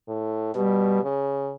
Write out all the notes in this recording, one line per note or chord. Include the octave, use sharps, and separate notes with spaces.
A2
B2 G3
C#3